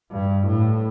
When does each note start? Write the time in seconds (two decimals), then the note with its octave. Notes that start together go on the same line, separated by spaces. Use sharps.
0.11 G2
0.47 A2